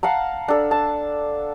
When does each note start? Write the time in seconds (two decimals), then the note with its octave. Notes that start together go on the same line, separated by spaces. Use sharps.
0.03 F5 F#5 A5 A#5
0.48 D4 A4
0.71 A5